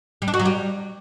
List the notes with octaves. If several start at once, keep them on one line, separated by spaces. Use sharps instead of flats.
G3
D4
F#4
F#3
G3